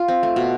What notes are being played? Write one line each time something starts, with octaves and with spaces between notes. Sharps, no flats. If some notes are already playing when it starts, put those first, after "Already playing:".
Already playing: F4
C4
A3
B2